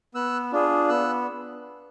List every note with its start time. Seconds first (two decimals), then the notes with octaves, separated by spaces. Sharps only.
0.15 B3 E6 F#6
0.53 D4 F4 G#4
0.89 B3 E6 F#6